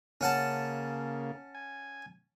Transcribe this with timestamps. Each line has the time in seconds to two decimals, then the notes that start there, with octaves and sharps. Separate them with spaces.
0.21 C#3 A#3 C#4 F#5 A5
1.55 G#5